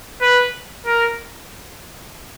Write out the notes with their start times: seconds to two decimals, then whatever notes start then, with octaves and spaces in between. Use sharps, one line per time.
0.22 B4
0.86 A#4